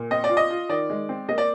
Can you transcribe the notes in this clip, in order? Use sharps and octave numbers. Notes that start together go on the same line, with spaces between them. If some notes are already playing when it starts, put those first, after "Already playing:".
Already playing: A#2
C4 D#5
D5
F4
D#5
F4
D#3 D5
G#3
C4
A#3 D#5
D5